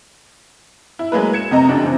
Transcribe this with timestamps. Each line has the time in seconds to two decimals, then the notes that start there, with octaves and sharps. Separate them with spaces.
0.99 E4
1.12 F#3 G#3 A#3 B4
1.33 G#6 C#7 E7
1.51 F2 C3 D#5 A#5
1.68 F#1 F2 C#3 D4 F#4
1.83 C3 E3 C4